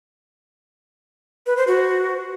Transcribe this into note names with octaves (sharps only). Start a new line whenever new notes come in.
B4
C5
F#4